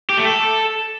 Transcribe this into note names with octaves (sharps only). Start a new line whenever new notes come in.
G4
A3
A4